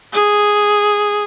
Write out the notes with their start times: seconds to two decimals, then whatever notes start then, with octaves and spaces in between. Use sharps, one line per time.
0.13 G#4